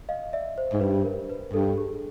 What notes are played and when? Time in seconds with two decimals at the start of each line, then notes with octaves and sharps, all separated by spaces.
0.09 D#5 F5
0.33 D5 E5
0.58 C5
0.73 G#2
0.81 G2 B4
1.05 A#4
1.30 B4
1.53 G2 A4
1.78 G#4